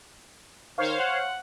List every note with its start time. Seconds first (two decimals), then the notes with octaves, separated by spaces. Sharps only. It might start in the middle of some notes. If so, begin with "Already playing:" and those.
0.78 D#3 C5 C#5 F5
0.98 F#5